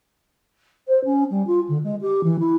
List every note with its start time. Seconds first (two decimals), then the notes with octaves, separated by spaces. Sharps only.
0.87 C5
1.04 C#4
1.30 G3
1.46 F4
1.68 D3
1.83 G#3
2.01 G4
2.23 E3
2.39 E4